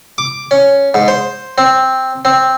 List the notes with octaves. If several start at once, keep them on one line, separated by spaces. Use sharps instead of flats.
D6
C#4
G#2
C5
C4
C4